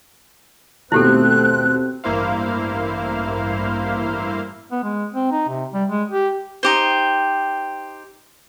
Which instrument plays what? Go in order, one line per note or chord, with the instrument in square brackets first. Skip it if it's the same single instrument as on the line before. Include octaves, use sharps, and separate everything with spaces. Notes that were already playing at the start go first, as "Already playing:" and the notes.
[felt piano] D#2 B2 [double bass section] A3 C4 [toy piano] E4 G4 A4 [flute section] F#6
[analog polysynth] A1 G2 A#3 E4 C5 F5
[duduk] B3
G#3
C4
D#4
C3
G3
G#3
G4
[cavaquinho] D#4 G4 C5